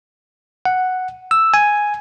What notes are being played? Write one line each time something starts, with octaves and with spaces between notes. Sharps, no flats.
F#5
E6
G#5